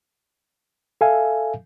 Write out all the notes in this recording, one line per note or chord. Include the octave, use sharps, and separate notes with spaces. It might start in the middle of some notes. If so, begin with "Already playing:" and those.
A4 E5 F5 G#5